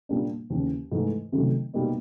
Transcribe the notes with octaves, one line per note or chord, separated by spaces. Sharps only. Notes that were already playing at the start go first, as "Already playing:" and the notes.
A#2 G3 A#3 D4
D#2 C#3 E3
G#2 E3 A3
C3 D#3 F#3 A3
B2 G3 A#3 D#4